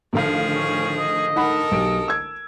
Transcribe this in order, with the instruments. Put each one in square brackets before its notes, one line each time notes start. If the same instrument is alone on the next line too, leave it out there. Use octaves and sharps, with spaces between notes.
[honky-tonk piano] A1 D3 F5 [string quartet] D#3 F3 G#4
[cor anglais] C#4
D#5
[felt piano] D#4 F#5 B5 [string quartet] A4 A#4
[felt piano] B1 G4 D7
E6 G#6